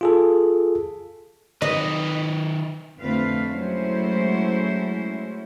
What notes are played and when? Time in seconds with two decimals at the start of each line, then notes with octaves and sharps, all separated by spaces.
0.01 F4 G#4 A4
1.62 D#3 B4 D#5
3.00 F2 D3 A3 C4 B4 F5
3.48 F#3 G#3 A3 C#4 E4 C5